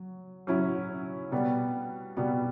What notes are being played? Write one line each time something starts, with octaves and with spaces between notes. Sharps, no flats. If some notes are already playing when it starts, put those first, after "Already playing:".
Already playing: F#3
F#3 C#4 E4
B2 G3 B3
B2 G3 B3